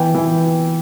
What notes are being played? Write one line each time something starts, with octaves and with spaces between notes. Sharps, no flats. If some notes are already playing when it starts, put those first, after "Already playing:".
Already playing: E3 B3 G5
E3